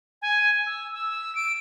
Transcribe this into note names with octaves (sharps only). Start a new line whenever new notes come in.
G#5
E6
E6
D7